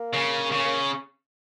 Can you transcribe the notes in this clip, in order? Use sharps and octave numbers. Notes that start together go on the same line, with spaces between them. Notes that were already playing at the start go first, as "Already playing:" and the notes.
Already playing: A#3
C#3
C#3
A#3